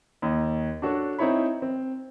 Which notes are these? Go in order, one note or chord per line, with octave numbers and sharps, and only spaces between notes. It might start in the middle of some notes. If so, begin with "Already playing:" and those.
D#2 D#5
D4 F#4 A4 C#5
C4 D#4 E4 C#5 B5
C4